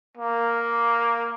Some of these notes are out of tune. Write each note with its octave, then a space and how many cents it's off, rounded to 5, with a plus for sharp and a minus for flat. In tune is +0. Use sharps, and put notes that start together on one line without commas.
A#3 +0